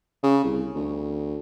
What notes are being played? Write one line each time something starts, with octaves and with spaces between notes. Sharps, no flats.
C#3
C2
D2